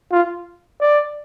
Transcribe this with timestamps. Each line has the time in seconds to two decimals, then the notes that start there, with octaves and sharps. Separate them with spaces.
0.12 F4
0.80 D5